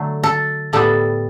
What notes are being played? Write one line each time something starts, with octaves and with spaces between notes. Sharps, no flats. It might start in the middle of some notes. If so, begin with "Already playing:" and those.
Already playing: D3 F#3 A3
A4
A2 G3 B3 A4